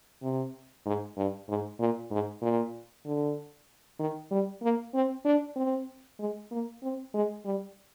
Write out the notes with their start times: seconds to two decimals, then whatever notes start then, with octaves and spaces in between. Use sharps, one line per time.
0.23 C3
0.86 G#2
1.17 G2
1.48 G#2
1.79 A#2
2.11 G#2
2.42 A#2
3.05 D3
3.99 D#3
4.31 G3
4.63 A#3
4.94 C4
5.25 D4
5.56 C4
6.19 G#3
6.51 A#3
6.83 C4
7.14 G#3
7.45 G3